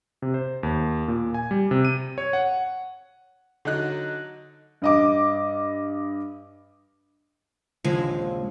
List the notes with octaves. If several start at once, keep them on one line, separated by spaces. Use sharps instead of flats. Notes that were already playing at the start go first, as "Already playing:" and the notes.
C3
C5
D#2
A#2
G#5
G3
C3
D#7
C#5
F#5
D3 F#3 D#4 F#6
G2 D#5 D6
D#1 A#1 C#3 F3 G#3